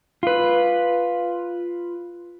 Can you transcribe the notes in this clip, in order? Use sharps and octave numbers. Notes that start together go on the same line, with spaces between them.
F4 B4